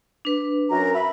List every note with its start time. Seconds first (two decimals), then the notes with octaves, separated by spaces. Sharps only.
0.25 D4 B4
0.70 F#2 A#5
0.94 E5 B5